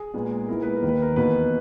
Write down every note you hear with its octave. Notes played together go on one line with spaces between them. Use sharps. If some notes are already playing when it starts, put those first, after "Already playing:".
Already playing: G#4
A#2 G#3 B3 D#4
A#2 G#3 B3 E4 A#4
B4
A#4
D#2 D#3 A#3
B4
A#4
E2 B2 A#3 D#4 B4